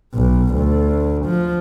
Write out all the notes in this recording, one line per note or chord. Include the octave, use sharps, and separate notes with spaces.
B1
D2
F3